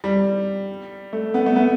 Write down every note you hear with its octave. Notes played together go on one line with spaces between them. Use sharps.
G3
A3
B3
A3
B3